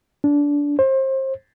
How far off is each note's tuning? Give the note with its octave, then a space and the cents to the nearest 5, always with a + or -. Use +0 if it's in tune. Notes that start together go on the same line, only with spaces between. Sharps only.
D4 -20
C5 +30